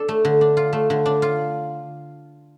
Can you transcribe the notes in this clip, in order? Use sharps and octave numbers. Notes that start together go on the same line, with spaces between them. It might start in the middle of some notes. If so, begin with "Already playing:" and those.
Already playing: D4 A4
A3
D3
D4
F4
A3
D3
D4
F4